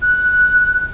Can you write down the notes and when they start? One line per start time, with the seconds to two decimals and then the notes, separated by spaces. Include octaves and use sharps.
0.02 F#6